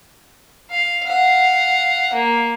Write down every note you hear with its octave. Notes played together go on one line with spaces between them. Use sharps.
F5
F5 F#5
A#3